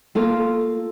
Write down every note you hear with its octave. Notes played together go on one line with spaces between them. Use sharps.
A#3 F4 A4